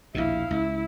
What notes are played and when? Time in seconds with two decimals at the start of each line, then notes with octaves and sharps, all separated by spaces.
0.15 A#1 D#2 B2 E4 F5
0.51 C#2 E4